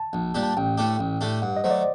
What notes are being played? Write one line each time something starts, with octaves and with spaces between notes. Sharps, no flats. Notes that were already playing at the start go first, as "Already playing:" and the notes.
Already playing: A5
A#1
A#2 G3 D4 G4
A5
A1 G5
A2 A3 D4 G4
A1
A2 A3 D4 G4
G2 F#5
D#5
F#3 A3 C5
D5